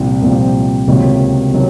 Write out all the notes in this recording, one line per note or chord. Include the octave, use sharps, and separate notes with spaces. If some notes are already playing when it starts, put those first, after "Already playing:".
Already playing: C2 A#2 F3 C4
C2 A#2 F3 C4
C#2 C3 D#3 F#3 A#3
C3 D#3 F#3